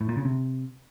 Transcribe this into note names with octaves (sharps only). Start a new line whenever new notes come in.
A2
A#2
C#3
C3